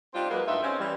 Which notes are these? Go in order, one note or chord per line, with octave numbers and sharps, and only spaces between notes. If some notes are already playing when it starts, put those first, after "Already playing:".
G3 C4 D4 D#4 F4
F#3 G#3 A#3 B4
G2 D#4 F4 E5
C4 C#4
E3 G3